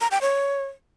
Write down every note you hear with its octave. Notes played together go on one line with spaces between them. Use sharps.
A#5
G5
C#5